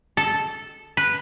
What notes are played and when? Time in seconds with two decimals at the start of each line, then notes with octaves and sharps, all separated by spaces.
0.17 A4
0.97 B4